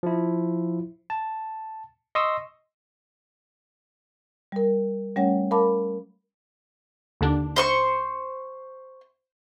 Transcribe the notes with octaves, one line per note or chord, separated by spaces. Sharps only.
F3 E4
A5
D#5 C6 C#6 D#6 E6
G3 A#4
G3 A3 C#4 C#5 F#5
A#4 F5 A5 B5 D6
D#2 D3 D4
C5 C6 C#6